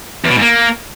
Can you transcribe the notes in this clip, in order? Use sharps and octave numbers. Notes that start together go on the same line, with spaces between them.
E2
B2
G#2
A#3